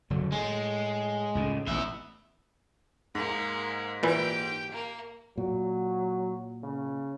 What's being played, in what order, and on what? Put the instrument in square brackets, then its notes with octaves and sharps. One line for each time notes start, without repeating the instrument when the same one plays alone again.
[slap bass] F#1 D3 F#3
[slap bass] A2 [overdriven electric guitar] G#3
[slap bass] C#2 A2 C#3
[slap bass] A1 B2 [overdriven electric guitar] B3 E5
[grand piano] G#2 [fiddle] G#3 A#3
[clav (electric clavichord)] A#2 E3 E4 [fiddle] G4 G5
[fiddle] A#3
[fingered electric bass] A#2 [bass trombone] F#3
[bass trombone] C#3